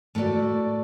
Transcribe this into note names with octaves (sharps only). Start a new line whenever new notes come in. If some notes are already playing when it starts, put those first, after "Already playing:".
A2 A3 F#4 D5